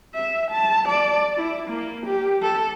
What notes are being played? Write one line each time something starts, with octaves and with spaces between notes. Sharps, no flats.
E5
A5
D5
E4
A#3
G4
A4